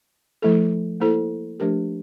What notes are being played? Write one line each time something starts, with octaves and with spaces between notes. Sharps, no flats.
F3 A3 E4 A4
A#3 E4 A4 C5
F3 A3 D4 G4 A#4